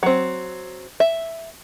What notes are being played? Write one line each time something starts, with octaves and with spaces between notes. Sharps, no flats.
F#3 C4
E5